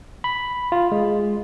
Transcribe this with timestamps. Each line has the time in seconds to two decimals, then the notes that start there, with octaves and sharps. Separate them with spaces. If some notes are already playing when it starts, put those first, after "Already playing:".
0.24 B5
0.72 F4
0.92 G#3